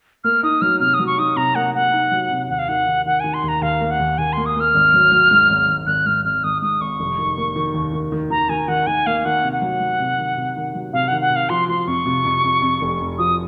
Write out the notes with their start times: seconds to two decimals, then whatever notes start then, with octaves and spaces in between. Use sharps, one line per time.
0.24 A#3 F6
0.43 D#4 D#6
0.62 F#3 F6
0.80 C3 F6
0.94 D#6
0.99 F#3
1.07 C#6
1.18 D#4 D#6
1.36 C3 A#5
1.55 A#3 F#5
1.74 A#3 F#5
1.93 D#4
2.12 F#3
2.31 C3
2.49 D#2 F#5
2.59 F5
2.69 D#3 F#5
2.86 D#3
3.06 D#3 F#5
3.20 D#3 G#5
3.34 C6
3.44 D#2 A#5
3.62 D#2 F5
3.81 A#3
3.91 F#5
3.99 D#2
4.18 D#2 G#5
4.33 A#3 C6
4.46 D#6
4.56 A#3 F6
4.74 G#1
4.94 F#3
5.12 F#3
5.31 G#2
5.50 G#1
5.68 G#1
5.87 G#1 F#6
6.05 G#2 F6
6.25 G#1 F6
6.44 G#1 D#6
6.62 G#2 D#6
6.81 G#1 C#6
6.99 F1
7.18 D#3
7.37 A#3
7.56 D#3
7.74 D#2
7.93 D#3
8.12 D#3
8.30 D#3 A#5
8.49 D#3 G#5
8.68 D#3 F#5
8.87 D#3 G#5
9.06 A#3 F5
9.25 D#3 F#5
9.43 C3
9.53 F#5
9.62 F#3
9.80 F#3
10.00 C3
10.18 D#3
10.37 C3
10.56 D#3
10.75 F#3
10.93 C3 F5
11.08 D#3 F#5
11.21 F#5
11.31 C3
11.36 F5
11.49 F3 C6
11.69 F3 C6
11.87 F2 C#6
12.06 C3
12.25 F2
12.44 F2
12.62 F2
12.81 F1
13.00 F2
13.18 F3 D#6